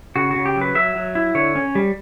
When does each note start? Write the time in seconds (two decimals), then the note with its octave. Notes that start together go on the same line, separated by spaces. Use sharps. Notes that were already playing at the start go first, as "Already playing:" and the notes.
0.16 C#3 F#4
0.31 F#4
0.36 C#3
0.46 G4
0.56 F#3
0.61 B4
0.75 F#3 E5
0.96 F#3
1.15 E4
1.35 D3 C#5
1.55 C#4
1.75 G3